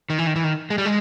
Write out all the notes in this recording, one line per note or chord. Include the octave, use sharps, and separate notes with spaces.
D#3
E3
D#3
E3
D#3
G#3
G3
G#3